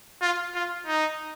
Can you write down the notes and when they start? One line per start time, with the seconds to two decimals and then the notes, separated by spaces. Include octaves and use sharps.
0.22 F4
0.55 F4
0.87 D#4